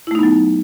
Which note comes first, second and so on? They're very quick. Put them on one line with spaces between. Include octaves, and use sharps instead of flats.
E4 A3 D#4 B3 F#3